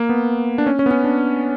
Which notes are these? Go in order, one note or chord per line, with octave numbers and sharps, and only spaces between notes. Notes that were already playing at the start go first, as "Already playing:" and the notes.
Already playing: A#3
B3
D4
C#4
C#4
B3
C#4
D4